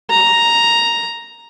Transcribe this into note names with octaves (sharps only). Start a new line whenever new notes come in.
A#5